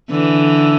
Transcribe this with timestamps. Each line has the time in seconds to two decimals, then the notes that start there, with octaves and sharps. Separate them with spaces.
0.11 D3 E3